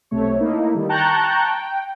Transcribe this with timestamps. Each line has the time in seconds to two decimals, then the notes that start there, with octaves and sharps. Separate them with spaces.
0.11 B1 C3 A3 C#5
0.39 A3 A#3 D#4 E4
0.75 D#3 G3
0.89 G5 A5 A#5 C#6 F#6 G6
1.47 G5